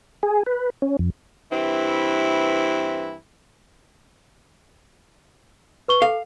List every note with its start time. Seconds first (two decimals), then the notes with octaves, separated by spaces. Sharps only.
0.23 G#4
0.46 B4
0.82 C#4
0.99 F2
1.52 G2 E3 C4 E4
5.88 B4 C#6 G7
6.02 A4 F5